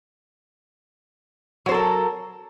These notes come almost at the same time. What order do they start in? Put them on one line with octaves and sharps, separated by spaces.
F#3 C5 A4 A#4